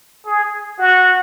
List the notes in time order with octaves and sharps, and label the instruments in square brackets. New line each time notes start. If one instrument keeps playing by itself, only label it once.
[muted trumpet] G#4
F#4